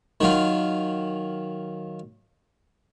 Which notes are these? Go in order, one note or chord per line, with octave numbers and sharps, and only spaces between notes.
D#3 F#3 F4